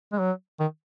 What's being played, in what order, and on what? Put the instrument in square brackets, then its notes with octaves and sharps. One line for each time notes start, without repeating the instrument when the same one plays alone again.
[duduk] G#3
F#3
D#3